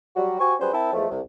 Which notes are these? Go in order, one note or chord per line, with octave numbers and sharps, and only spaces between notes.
F#3 G3 F#4
F#4 G4 C5 G#5 C#6
F#3 G3 C#4 G#4 B4 C5
C4 E4 A#4 E5 G5 A5
E2 F3 G#3 A3
C2